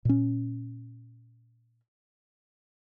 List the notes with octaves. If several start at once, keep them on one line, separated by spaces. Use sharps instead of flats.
A#2 C#4